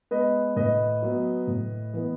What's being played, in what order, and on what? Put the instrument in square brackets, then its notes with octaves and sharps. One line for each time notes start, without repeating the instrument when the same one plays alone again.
[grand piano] G#3 B3 B4 D#5
A2 B4 D#5
F#3 B3
A2
E3 B3